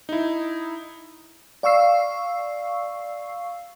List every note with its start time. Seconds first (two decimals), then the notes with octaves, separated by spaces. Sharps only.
0.09 D#4 E4
1.63 D5 F5 C#6 E6 C7